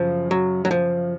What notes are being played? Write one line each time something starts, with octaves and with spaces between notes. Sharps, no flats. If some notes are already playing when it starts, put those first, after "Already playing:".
Already playing: F#2 C#3 F3
F#3
F#3
F3